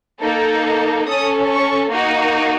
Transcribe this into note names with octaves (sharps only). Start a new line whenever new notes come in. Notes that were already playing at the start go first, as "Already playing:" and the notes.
A#3 D#4 A4
C#4 A4 D#6
C#6
A#3 D#4 F#4